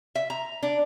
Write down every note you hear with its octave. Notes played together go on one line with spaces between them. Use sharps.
E5
A#5
D4